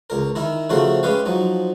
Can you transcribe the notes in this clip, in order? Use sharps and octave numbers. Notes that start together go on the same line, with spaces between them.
C#2 A#4
D#3 E4 A#4
C#3 F3 A3 F#4 A#4 C5
G#3 C#4 G4 B4 F5
F3 F#3 D#4